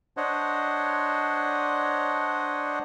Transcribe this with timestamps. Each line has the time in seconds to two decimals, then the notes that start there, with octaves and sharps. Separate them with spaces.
0.17 D4 C5 C#5 D#5 F#5